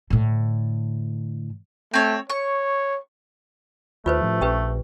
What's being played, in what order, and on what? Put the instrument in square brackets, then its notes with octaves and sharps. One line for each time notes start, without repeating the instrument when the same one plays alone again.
[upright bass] A2 D3
[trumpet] A3 [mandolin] C4 C#5
[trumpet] C#5 [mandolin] C#6
[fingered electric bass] D#2 [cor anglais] A3 [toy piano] F4 B4 C5
[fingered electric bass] A2 F3
[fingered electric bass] A#1 [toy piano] C#4 G4 B4